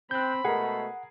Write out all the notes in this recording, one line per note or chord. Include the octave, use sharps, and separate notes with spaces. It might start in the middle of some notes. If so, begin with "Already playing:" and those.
C4 B5 F#6 G6
B2 G#3 A3 G#4 A#4 F#5